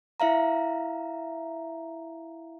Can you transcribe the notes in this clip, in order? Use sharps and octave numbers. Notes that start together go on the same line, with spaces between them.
E4 E5 F5 A#5